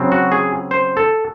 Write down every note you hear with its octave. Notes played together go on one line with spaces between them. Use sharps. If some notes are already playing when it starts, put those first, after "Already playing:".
Already playing: C#3 F#3 C4
F#4
G#4
C5
A4